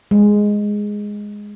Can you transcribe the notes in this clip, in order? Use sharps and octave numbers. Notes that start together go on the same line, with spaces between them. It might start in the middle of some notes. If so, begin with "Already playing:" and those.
G#3